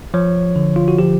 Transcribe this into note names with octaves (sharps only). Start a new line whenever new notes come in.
F3 C#5
D3
F4
F#4
F3 G4